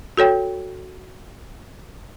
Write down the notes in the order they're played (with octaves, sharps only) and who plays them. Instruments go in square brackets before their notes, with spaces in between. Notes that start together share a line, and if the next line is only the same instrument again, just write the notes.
[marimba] F#4 A4 C#5 G5